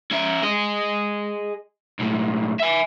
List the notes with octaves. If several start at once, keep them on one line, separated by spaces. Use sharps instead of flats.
C#4 E5
G#4 D#5
B1 A2
E5 G#5